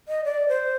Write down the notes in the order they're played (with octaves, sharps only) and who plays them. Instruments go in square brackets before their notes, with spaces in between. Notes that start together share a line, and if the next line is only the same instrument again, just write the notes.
[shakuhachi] D#5
D5
C5